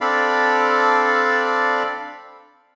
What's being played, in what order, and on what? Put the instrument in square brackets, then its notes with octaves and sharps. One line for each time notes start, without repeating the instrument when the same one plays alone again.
[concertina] C4 D4 A4 D5 F5 B5